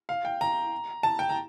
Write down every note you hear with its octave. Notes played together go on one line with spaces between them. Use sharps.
F5
G5
A#5
A5
G5
A#5